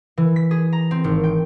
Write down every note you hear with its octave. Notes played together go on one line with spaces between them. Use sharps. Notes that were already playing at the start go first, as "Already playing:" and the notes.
E3
B6
G#4
A#5
C4
G#1
G5